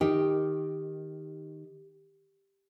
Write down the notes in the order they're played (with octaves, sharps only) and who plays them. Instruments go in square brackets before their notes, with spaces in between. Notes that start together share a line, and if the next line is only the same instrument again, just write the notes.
[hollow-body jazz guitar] D#3 [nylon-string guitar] G4